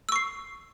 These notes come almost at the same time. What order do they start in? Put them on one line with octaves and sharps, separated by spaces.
E6 C#6 C7